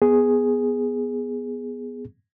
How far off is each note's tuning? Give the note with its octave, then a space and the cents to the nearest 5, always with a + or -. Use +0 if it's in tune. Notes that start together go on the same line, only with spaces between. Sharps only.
B3 +0 G#4 +0